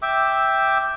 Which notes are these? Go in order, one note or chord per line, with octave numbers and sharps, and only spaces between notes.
E5 G5 D6 E6